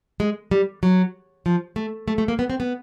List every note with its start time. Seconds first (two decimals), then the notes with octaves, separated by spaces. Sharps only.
0.20 G#3
0.51 G3
0.83 F#3
1.46 F3
1.76 A3
2.08 A3
2.18 A3
2.28 A#3
2.39 B3
2.50 C4
2.60 B3